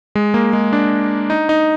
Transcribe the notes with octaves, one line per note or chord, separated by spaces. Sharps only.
G#3
A#3
G#3
D4
D#4
D#4